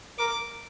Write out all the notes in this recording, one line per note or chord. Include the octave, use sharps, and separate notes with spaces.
A#4 D6